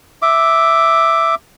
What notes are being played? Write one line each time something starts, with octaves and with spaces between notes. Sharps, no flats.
E5 D6